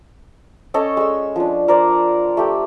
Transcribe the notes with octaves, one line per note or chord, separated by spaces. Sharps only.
C#4 A4 C#5 D#5
G#3 E6
F3 D4
A#4 C5 D5
A3 G4